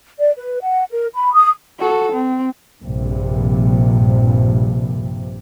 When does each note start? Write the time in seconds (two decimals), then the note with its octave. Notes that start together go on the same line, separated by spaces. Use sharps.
0.20 D5
0.37 B4
0.61 F#5
0.91 A#4
1.14 B5
1.34 D#6
1.79 F#4 A4
2.12 C4
2.82 A#1 G2 C3